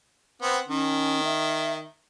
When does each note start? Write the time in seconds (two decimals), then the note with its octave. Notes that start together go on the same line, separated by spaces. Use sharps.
0.42 B3 C4
0.68 D#3 C#4
1.24 E5